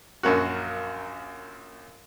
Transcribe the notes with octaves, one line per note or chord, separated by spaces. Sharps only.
A#1 F#2 A#3 F#4